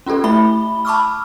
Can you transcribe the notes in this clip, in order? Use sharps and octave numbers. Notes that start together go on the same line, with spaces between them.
C#4 F4 G4 A4 B4
A3 E4 G4 E5 B5 G7
A5 B5 C#6 D6 E6 F6